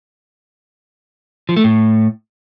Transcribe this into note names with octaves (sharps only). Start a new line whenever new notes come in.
F3
A3
A2